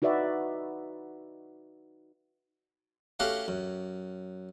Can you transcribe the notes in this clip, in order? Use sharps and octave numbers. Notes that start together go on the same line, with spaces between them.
D#4 F#4 B4 D5 E5
A3 C#4 F#4 G4 F5 F#5
F#2